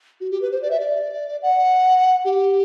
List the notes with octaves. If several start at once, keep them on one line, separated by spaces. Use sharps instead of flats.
F#4
G4
B4
C5
D5
E5
D5
F#5
G4